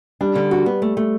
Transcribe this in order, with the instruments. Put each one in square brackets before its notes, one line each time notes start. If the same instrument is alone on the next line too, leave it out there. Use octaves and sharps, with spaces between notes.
[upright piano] G3 [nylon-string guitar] D4
[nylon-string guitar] D3
F#4
B3
A3
A3